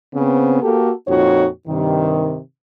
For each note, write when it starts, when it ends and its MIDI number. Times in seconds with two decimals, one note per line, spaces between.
0.13 0.59 49
0.13 0.59 59
0.13 0.59 60
0.62 0.92 58
0.62 0.92 66
0.62 0.92 67
0.62 0.92 69
1.07 1.47 41
1.07 1.47 46
1.07 1.47 63
1.07 1.47 66
1.07 1.47 73
1.67 2.38 43
1.67 2.38 48
1.67 2.38 51